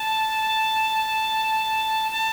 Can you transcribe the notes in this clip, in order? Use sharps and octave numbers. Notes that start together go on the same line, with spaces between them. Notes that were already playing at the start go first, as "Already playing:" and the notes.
Already playing: A5
A5